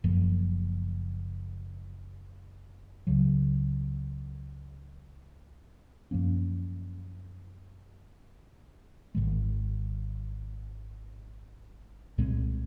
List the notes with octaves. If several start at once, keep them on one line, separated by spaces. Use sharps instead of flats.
F#1 F#2 F3 A#3
C#2 C#3 F#3
F#2 F3 A#3 C#4
G#1 G#2 D#3 G#3
C2 A#2 G#3 C4